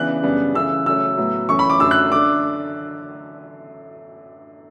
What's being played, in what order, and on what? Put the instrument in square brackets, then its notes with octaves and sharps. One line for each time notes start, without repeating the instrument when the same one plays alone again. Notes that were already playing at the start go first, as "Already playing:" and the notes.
Already playing: [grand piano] C#3 E3 B3 D4 F#6
F#2 C#3 G3 B3 D4
C#3 E3 A3 E6
C#3 F#3 A3 C#4 E6
A2 F#3 B3
F#2 E3 A3 C#4 C#6
B5
D6
F#2 D3 F#3 A3 E6
F#6
D3 A3 D4 D6